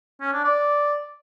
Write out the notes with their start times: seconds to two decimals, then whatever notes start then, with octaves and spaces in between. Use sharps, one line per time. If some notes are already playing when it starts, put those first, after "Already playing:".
0.21 C#4
0.33 D4
0.44 D5